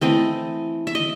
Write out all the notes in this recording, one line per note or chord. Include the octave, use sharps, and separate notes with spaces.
E3 A3 C4 D#5
E5
D#5